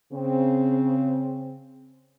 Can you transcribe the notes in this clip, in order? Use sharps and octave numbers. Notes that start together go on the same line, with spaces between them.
C#3 C4